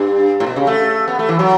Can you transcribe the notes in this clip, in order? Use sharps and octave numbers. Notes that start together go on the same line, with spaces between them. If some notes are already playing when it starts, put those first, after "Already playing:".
Already playing: G2
A2
B2
C#3
A3
B3
A3
E3
F#3